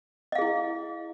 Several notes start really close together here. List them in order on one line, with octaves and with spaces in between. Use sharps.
D#5 F5 G#4 E4